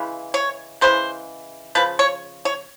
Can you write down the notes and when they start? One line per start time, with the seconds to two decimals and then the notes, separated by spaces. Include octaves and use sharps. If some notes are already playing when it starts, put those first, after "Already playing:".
Already playing: C#3 E3 G#3
0.34 C#5
0.81 C#3 E3 G#3 C5
1.75 C#3 F3 B4
1.99 C#5
2.45 C#5